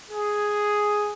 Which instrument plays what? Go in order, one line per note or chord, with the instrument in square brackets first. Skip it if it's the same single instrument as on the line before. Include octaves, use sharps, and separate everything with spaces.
[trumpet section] G#4